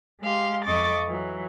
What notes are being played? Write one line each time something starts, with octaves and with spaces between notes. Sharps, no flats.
G#3 G4 F5 C6
F2 D#5 C#6 D6 A6
E3 F#3